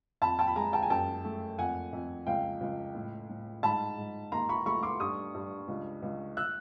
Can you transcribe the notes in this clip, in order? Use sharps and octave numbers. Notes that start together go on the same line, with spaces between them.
F2 A5 B5
G5 A5
B5
G#3 G#5 A#5
G5 A5
G#5
F#2 G5 A5
A3
F2 F#5 G#5
F2
C#2 F5 G5
C#2
A2
A2
G#2 A5 B5
G#2
D#2 A#5 C6
B5 C#6
A3 B5 C#6
C6 D6
G2 C#6 D#6
G2
C#2
C#2
E6 F#6